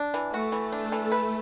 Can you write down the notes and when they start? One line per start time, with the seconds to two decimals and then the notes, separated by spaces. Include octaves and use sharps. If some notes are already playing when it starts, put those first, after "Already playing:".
Already playing: D4
0.14 E3
0.33 A3 F#4
0.52 E3
0.72 D4
0.92 E3
1.12 B4